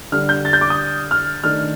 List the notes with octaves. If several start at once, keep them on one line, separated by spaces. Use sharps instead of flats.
D3 G3 D4 F6
G6
A6
G6
D6
D#6
F6
D#3 A3 D4 F6